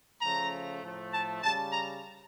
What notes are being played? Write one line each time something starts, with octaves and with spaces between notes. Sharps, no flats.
C#3 F3 A3 A#5
A2 F3 A3
A5
C#3 G3 A5
A#5